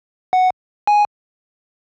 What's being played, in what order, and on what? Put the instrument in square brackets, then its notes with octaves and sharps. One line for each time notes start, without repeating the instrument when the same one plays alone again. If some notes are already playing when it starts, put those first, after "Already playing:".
[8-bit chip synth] F#5
G#5